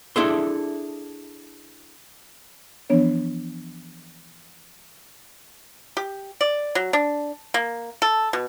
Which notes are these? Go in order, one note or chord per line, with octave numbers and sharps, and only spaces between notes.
D4 E4 G#4 A4 E5 C6
E3 F3 B3 D4 C#5
G4
D5
F#3
D4
A#3
A4
B2